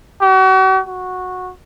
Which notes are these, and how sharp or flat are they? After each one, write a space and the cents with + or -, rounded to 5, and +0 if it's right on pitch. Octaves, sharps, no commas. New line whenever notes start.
F#4 +40
F#4 -10